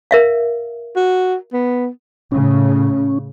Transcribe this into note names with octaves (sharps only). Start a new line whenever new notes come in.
A#4 E5 F5
F#4
B3
A2 C#3 C#4